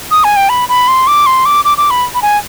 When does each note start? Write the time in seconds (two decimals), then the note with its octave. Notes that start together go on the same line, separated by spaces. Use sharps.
0.11 D#6
0.24 G#5
0.36 G5
0.49 B5
0.69 B5
0.88 C6
1.07 D6
1.26 C6
1.46 D6
1.65 D6
1.78 D6
1.91 B5
2.15 B5
2.22 G#5